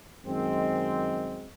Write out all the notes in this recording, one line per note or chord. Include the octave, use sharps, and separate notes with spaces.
F#2 D#3 G#3 C4